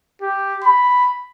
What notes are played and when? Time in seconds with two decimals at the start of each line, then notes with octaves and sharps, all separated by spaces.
0.22 G4
0.64 B5